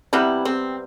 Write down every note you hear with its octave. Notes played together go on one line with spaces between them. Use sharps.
C3 G3 B3 E4
C4